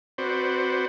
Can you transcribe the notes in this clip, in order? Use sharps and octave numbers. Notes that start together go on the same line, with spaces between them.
C4 F#4 B4 C5 D5